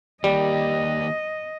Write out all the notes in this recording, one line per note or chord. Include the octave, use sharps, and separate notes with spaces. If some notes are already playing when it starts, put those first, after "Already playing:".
D#3 G3 A#3 G4 D#5